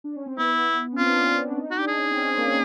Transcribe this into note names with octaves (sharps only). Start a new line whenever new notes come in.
D4
C#4
C4
B3 E4
C#4
C4 F4
D4
C#4
D4
D4
D#4
F#4
D4 G4
G#4
C#4
C4
C#4
A#3